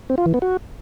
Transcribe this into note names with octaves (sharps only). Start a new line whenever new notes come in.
C4
F4
E3
B3
F#4